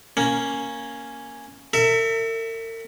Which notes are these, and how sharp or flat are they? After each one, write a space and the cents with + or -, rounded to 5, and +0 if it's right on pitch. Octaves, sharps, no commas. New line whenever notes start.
A#3 +0 C#4 +0
A#4 -45 E5 +0